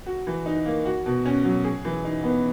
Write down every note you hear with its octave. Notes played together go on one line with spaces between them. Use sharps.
F#4
E3
D#4
A#3
F#4
B2
C#4
F#3
G#4
E3
D#4
B3